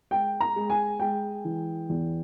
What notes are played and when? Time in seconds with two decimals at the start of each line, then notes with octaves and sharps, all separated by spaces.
0.11 G#3 G5
0.40 A#5
0.56 G#3
0.70 G#5
1.00 G#3 G5
1.45 E3
1.89 E2